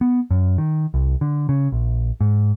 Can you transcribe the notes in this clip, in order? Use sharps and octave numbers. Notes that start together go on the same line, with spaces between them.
B3
F#2
D#3
C2
D3
C#3
A#1
G#2